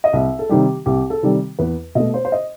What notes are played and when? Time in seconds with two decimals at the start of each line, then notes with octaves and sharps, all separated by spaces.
0.04 D#5
0.13 C2 E5
0.39 A4
0.49 C3 D#3 G3 G4
0.86 C2 G4
1.10 A4
1.23 C3 D#3 G3
1.59 E2 B4
1.95 B2 A3 D#5
2.14 C5
2.25 C5
2.32 D#5